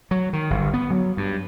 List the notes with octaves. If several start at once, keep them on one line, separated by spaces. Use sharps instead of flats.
F#3
D#3
G1
B3
F#3
G2